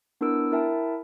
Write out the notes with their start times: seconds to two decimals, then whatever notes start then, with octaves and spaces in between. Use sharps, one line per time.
0.21 B3 D4 E4 A#4 E6 D7
0.52 E4 A#4 E5 G5 A5